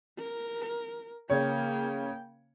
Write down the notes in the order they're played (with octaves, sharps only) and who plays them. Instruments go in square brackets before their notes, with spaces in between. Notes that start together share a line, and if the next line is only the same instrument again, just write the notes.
[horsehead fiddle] A#4
[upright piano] C#3 C#5 [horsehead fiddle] A#3 G5